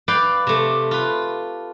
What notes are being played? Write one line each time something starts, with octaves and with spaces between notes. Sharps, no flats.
B4 D5 F5 G5
C3 A3
F4 B4